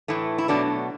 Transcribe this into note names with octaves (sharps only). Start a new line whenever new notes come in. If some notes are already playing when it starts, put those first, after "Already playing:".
A2 E3 A3
E4
B2 F#3 A3 D4